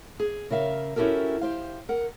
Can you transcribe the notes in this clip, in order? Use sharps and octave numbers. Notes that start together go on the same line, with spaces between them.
G#4
C#3 A#4 E5 F5
C#4 E4 F#4 G4 A4 A#4
G4 C5 F5
A#4 F#5